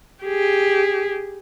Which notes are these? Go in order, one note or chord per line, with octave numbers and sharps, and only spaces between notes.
G4 G#4